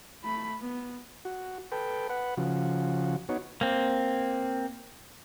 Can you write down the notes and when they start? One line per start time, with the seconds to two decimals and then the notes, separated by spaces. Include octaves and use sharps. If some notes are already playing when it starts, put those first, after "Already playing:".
0.24 A3 B5
0.60 B3
1.25 F#4
1.72 A4 B4 G5
2.10 B4 F#5
2.37 C#3 F3 F#4
3.29 B3 D#4 F#4 C#5
3.61 A#3 C4